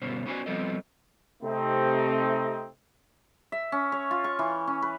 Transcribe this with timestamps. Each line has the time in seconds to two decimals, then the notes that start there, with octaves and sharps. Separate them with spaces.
0.02 D2 G2 B2 C#4 C5
0.26 B3 C#4 F#4 C5 G#5
0.46 F3 G3 B3 C4 A4 D#5
1.43 C3 A3 C4 D#4
3.52 E5
3.72 C#4
3.92 C#5
4.11 F4
4.24 C#6
4.39 E3
4.67 C#4
4.82 B4